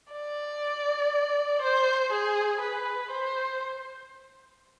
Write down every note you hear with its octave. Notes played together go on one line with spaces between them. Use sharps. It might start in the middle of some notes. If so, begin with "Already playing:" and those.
D5
C5
G#4
B4
C5